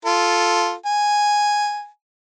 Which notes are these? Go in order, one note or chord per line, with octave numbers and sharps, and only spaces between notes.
F4 A4
G#5